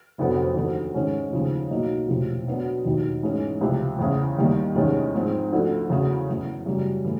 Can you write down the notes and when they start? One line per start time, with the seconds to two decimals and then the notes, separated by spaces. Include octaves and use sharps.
0.18 F1 F2 D3 F#3 B3
0.56 D#2 D3 F#3
0.94 G#2 D#3 G#3 C#4
1.32 D#2 C#3 F3 G#3
1.70 B1 B2 F#3 A#3 D#4
2.08 E1 D2 C3 F3
2.47 B2 F#3 B3 D4
2.85 E1 D#2 D#3 F#3
3.23 G#2 E3 G#3 C#4
3.61 C#2 C3 F3
3.99 E2 C#3 E3
4.38 D#2 D#3 G3 A#3
4.75 E2 C3 D#3 G#3 C#4
5.15 G#2 F3 G#3 C4
5.53 D2 D3 F3
5.90 E2 C#3 F#3
6.29 F#1 E2 C#3
6.66 F#2 C#3 E3 G3
7.04 A2 E3